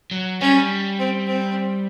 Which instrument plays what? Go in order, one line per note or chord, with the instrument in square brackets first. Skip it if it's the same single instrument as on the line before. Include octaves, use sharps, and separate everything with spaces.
[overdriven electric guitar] F#3
[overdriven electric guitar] G3 [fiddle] C#4
[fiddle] C4
C4